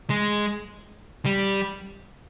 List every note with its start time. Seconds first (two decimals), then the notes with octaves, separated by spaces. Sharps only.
0.10 G#3
1.25 G3